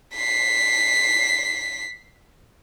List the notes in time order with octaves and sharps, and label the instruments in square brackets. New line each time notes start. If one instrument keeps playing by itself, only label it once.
[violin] B6 C7